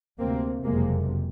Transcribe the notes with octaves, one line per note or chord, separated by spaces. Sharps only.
D2 C3 A#3 C4
F#1 F2 C3 G#3 A#3